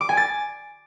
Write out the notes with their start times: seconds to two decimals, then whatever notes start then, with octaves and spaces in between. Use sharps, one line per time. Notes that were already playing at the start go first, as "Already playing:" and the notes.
0.01 D6
0.09 G#5
0.17 A6